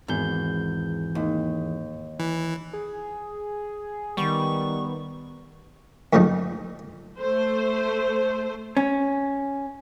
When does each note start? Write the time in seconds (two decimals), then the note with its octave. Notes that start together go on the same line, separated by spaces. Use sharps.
0.08 G#1 E2 G6
1.15 D#2
2.19 E3
2.73 G#4
4.17 D#3 G3 B3 C#6
6.13 F#2 A2 D3 F3 A3 D#4
7.21 A3 C5
8.77 C#4